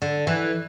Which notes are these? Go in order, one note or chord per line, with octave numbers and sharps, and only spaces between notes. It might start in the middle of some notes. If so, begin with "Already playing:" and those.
D3
E3